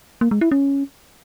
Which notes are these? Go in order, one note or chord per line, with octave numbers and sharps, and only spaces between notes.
A#3
G#3
E4
C#4